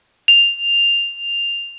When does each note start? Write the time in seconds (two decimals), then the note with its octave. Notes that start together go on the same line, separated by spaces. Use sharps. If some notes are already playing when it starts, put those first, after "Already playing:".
0.28 F7